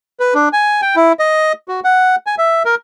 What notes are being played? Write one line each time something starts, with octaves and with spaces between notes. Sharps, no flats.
B4
D4
G#5
G5
E4
D#5
F#4
F#5
G#5
E5
A#4